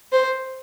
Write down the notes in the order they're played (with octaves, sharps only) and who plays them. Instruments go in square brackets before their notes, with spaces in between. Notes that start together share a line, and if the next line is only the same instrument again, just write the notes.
[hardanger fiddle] C5